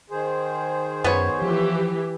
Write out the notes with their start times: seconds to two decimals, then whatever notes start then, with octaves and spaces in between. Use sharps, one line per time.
0.10 D#3 G#4 C5
1.04 F#2 B3 C#5
1.42 E3 F3 G4